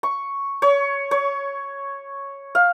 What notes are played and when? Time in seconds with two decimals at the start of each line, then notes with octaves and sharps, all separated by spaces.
0.03 C#6
0.62 C#5
1.11 C#5
2.55 F5